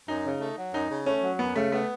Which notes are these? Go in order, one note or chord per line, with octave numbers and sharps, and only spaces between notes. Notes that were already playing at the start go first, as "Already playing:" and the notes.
F#2 D#4
C#3
A3
F#3
F#2 D#4
C#3
A3 C#4
F#3
F#2 B3
C#3 A3
A3 B3